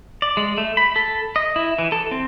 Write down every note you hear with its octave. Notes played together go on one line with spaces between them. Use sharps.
D5
G#3
A3
B5
A4
D#5
E4
E3
A4
C4